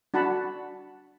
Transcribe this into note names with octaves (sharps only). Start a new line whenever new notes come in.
D4 F#4 F#5 A5 B5